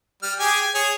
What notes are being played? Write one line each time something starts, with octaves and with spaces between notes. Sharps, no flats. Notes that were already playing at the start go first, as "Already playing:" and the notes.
G3 F6
G4 G#4 G#5
G#5
G#4 C#5